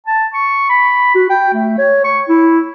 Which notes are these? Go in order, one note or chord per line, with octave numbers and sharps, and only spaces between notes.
A5
C#6
B5
F#4
G5
A3
C#5
C#6
E4